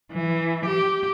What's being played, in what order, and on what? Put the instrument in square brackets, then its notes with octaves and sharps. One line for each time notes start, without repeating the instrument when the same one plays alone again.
[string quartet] E3
G4